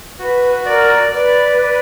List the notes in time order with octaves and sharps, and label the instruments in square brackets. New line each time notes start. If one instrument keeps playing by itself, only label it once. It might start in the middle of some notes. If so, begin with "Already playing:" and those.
[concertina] F#4 [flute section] B4
[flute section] A#4 [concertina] D5
[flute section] B4 [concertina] D5
[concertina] D5